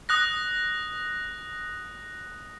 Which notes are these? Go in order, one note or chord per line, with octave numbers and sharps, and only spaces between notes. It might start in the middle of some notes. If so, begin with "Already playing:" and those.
D#6 F#6 A#6